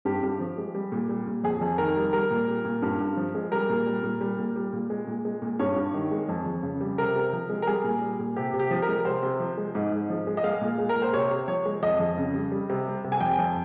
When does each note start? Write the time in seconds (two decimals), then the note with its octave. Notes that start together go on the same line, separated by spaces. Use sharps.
0.05 G2 G4
0.23 G2
0.40 F3
0.58 G#3
0.75 G3
0.92 A#2
1.09 G3
1.27 A#2
1.44 F2 G#4
1.61 F2
1.78 D#3 A#4
1.96 G3
2.13 G3 A#4
2.31 A#2
2.47 G3
2.65 A#2
2.82 G2
3.00 G2
3.17 F3
3.35 G#3
3.52 G3 A#4
3.69 A#2
3.86 G3
4.03 A#2
4.21 G3
4.38 A#2
4.56 G3
4.73 A#2
4.90 G#3
5.07 A#2
5.25 G#3
5.42 A#2
5.59 G2 C#5
5.76 G2
5.94 D#3
6.11 G#3
6.29 F2
6.46 F2
6.63 C#3
6.81 G3
6.98 C3 A#4
7.16 C3
7.33 F3
7.50 G#3
7.62 A#4
7.67 G3 G#4
7.84 A#2
8.02 G3
8.19 A#2
8.36 C3 G4
8.54 C3
8.59 G4
8.71 F3
8.82 A#4
8.88 G#3
9.05 C3 C5
9.23 C3
9.40 F3
9.58 G#3
9.75 G#2
9.92 G#2
10.10 F3
10.27 G#3
10.37 D#5
10.44 G#3 F5
10.61 A#2
10.78 G#3
10.89 A#4
10.96 A#2
11.02 C5
11.13 C3 C#5
11.31 C3
11.48 F3 C#5
11.66 G#3
11.83 F2 D#5
12.00 F2
12.18 C#3
12.34 G3
12.52 G3
12.69 C3
12.87 G3
13.04 C3
13.12 G#5
13.21 F2 G5
13.38 F2